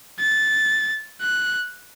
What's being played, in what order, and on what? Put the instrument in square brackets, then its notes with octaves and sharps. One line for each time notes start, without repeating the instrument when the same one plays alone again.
[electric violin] A6
F#6